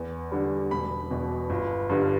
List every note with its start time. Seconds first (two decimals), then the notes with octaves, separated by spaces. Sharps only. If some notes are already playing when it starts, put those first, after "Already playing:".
Already playing: E2
0.32 D3 G3
0.71 E1 B5
1.10 E2 B2
1.50 G1
1.89 G2 D3 G3